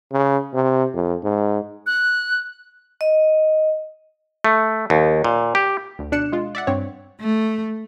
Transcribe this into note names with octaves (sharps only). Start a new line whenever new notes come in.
C#3
C3
F2
G#2
F#6
D#5
A3
D#2
A#2
G4
D2
B2 D4 D5 F#6 C#7 E7
G#3 F4
D5 E5 F#5
G2 C4 C#5
A3